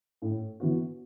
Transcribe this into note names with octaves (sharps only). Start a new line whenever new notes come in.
A2
E3 B3 F#4